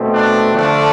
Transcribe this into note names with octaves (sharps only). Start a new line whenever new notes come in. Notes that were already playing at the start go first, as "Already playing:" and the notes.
Already playing: B2 A3 C4
D4
D3 F3 A3 D4